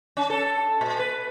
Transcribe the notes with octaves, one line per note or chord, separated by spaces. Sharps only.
C#4
A4
A#2
B4